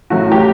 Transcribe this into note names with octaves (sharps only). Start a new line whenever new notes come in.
A2 F#3 A3 F#4
G4